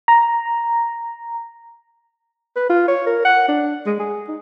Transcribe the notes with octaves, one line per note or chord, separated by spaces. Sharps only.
A#5
B4
F4
C#5
A#4
F#5
D4
G#3
G#4
D#4